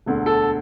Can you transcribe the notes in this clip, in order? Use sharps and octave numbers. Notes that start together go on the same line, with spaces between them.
E1 D2 D3
A4